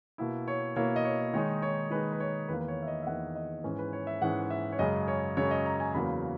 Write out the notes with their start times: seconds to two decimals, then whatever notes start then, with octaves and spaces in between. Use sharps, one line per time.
0.18 B2 A#3 E4
0.48 C#5
0.76 B2 A#3 E4 C#5
0.96 D#5
1.05 C#5
1.34 D#3 G#3 D#4 C#5
1.62 C#5
1.91 D#3 G#3 D#4 B4
2.13 B4
2.20 C#5
2.48 E2 D#3 A#3 B4
2.60 B4
2.68 C#5
2.82 E5
2.87 D#5
3.02 E5
3.06 E2 D#3 A#3 F#5
3.35 D#5
3.64 G#2 E3 G#3 C#4
3.79 B4
3.93 C#5
4.07 E5
4.21 G#2 E3 G#3 C#4 F#5
4.50 E5
4.72 C#5
4.79 F#2 C#3 G#3 D#5
5.08 C#5
5.37 F#2 C#3 G#3 C#5
5.51 D#5
5.66 A#5
5.80 G#5
5.94 E2 C#3 F#3 A#3 B5